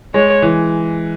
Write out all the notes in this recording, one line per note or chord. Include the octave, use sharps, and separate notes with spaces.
G#3 C#5
E3